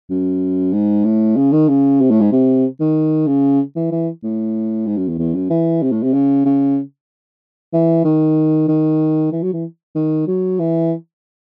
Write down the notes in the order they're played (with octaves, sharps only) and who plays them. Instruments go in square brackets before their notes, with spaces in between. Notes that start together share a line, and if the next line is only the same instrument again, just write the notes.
[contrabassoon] F#2
G#2
A2
C#3
D#3
C#3
C3
A2
G#2
C3
D#3
C#3
E3
E3
A2
G#2
F#2
E2
E2
F#2
E3
C3
A2
C3
C#3
C#3
E3
D#3
D#3
E3
F#3
E3
D#3
F#3
E3